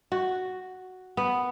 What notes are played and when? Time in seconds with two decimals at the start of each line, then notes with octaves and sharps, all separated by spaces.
0.12 F#4
1.17 B3